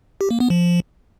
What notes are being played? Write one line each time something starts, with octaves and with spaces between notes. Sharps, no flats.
G4
A#3
B3
F3